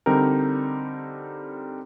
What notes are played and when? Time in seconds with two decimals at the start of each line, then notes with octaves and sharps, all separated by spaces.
0.06 D3 G3 C4 D#4 A#4